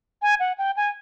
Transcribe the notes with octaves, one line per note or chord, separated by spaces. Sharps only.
G#5
F#5
G5
G#5